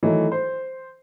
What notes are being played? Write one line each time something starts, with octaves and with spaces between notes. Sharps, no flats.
D#3 E3 F#3 A3 D#4
C5 C6